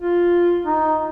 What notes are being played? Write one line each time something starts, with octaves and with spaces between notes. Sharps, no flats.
F4
D#4